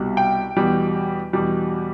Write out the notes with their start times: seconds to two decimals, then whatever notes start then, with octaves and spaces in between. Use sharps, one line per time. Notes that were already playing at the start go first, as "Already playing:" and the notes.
Already playing: C2 B2 G3
0.17 G5
0.56 E2 B2 G3
1.33 E2 B2 G3